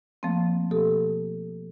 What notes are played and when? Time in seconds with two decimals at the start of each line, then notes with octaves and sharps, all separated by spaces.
0.23 F3 A3 A#3 C4
0.71 B2 G4 A4